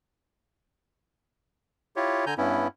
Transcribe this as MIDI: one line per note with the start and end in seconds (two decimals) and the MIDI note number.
1.96 2.25 64
1.96 2.25 65
1.96 2.25 67
1.96 2.25 73
2.26 2.34 50
2.26 2.34 80
2.26 2.34 82
2.26 2.34 91
2.38 2.68 43
2.38 2.68 59
2.38 2.68 61
2.38 2.68 64